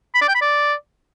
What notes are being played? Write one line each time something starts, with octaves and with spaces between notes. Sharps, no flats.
B5
D5
G5
B5
D5